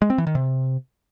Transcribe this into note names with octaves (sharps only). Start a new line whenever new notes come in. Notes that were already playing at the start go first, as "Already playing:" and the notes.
G#3
C4
E3
D#3
C3